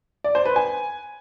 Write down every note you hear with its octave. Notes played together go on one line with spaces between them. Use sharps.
D5
C5
B4
G#5